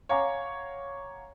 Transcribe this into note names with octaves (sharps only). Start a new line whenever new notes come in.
C#5 F5 F#5 G#5 A#5 D6